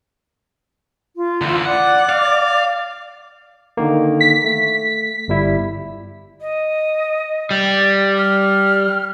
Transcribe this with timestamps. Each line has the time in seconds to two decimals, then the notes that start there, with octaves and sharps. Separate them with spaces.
1.16 F4
1.41 D2 E3
1.65 D5 F#5 D6
2.09 F5
3.77 D3 D#3 A#3
4.21 B6
4.44 A3
5.28 G1 G3 E4
6.41 D#5
7.51 G3
8.17 F6